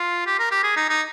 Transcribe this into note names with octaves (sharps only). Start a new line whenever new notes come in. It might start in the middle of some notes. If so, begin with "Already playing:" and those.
Already playing: F4
G4
A#4
G4
G#4
D#4
D#4